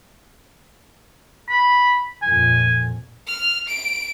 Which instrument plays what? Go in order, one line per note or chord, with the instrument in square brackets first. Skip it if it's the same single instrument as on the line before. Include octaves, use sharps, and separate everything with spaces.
[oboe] B5
[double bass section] F2 A#2 [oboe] G#5
[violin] F6
D7